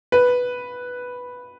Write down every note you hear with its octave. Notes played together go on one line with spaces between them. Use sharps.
B4